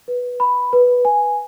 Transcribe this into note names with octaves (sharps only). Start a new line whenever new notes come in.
B4
B5
B4
G#5